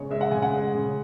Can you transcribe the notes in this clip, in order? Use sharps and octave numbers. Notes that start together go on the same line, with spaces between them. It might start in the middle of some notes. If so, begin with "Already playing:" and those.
Already playing: C#3 G#3 C#5
G#3 E5
F#5
C#3 G#5
F#5
G#3
C#3